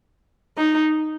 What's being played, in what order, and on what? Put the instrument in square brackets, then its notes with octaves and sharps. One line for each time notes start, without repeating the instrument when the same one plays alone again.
[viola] D#4